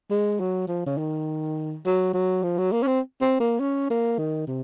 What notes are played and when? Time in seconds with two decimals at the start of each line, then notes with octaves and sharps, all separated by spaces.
0.11 G#3
0.40 F#3
0.68 F3
0.86 C#3
0.98 D#3
1.86 F#3
2.14 F#3
2.43 F3
2.58 F#3
2.72 A#3
2.83 C#4
2.87 C4
3.21 C4
3.40 A#3
3.60 C#4
3.90 A#3
4.18 D#3
4.48 C3